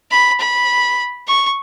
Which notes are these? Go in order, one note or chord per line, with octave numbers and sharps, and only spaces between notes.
B5
B5
C#6